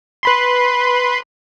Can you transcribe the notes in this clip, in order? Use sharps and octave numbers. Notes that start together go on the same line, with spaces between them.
B4 B5 C6